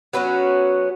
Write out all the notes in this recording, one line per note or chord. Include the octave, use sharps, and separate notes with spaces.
F#3 B3 C#4 F#4